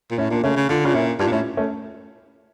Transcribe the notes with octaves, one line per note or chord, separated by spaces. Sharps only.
A#2
A2 C#4 E4
A#2 A#3 D4
C#3 A3 C#4
C#3
D3 F4
C#3 D4 F4
A#2 C#4 E4
G2 D4 F4
A#2
A2 C#4 E4
A3 C#4